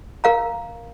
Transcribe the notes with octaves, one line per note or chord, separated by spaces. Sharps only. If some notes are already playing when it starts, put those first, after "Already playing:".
A#4 F5 A#5